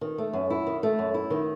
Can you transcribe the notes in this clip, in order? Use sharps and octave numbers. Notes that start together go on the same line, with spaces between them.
D#3
A3
F#2
E4
D#3
A3
F#2
E4
D#3